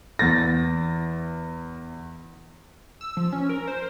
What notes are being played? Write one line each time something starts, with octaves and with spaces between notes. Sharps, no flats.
E2 A6 A#6
E6
F3
C#4
A#4
C5